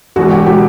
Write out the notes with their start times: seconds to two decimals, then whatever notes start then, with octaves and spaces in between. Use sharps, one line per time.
0.16 E1 E2 B2 G#3 F#4
0.31 G4
0.46 B2 G#3 G4